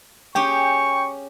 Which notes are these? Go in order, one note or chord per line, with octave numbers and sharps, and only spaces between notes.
C#4 G4 G#4 G5 C#6